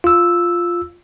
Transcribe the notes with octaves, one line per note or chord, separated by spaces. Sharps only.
F4 E6